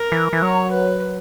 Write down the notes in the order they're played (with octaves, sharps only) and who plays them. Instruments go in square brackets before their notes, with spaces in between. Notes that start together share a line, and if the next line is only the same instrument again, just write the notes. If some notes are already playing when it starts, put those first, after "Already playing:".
Already playing: [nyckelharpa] A#4
[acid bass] E3
E3
[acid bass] F#3 [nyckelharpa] C#5
[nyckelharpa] B4